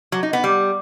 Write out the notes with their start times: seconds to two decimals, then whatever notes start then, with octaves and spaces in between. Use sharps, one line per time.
0.12 F#3
0.23 D#4
0.33 B3
0.44 G3